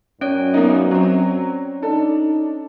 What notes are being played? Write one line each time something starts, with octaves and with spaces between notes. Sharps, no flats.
F#2 C#4 C#5 D5
A#3 B3 D#4
F#3 C4
D4 D#4 A4